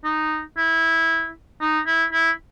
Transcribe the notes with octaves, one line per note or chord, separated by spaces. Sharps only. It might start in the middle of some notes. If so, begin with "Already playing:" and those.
D#4
E4
D#4
E4
E4